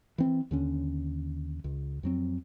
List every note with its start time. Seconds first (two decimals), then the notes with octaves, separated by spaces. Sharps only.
0.18 E3 C4
0.51 D#2 D3 C#4
1.64 C#2
2.03 F2 F#3 C4